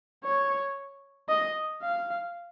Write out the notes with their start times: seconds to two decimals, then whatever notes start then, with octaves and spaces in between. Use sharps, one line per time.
0.24 C#5
1.29 D#5
1.83 F5